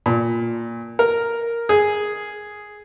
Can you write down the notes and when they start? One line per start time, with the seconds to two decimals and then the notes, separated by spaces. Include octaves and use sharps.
0.06 A#2
0.99 A#4
1.69 G#4